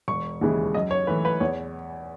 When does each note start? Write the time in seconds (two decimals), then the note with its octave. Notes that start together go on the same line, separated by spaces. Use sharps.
0.08 E1 C#6
0.41 D#2 C#3 E3 G#3
0.74 F#2 D#5
0.91 C#5
1.07 E3 A3 B4
1.25 B4
1.40 E2 C#5